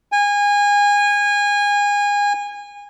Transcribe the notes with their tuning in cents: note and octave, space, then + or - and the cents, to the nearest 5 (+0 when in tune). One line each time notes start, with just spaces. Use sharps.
G#5 -25